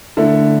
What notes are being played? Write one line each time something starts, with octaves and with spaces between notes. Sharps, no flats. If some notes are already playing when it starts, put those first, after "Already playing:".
D3 A3 E4 A4